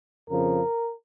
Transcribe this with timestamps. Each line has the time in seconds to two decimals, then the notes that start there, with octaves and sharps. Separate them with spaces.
0.29 F2 C#3 F3 A#4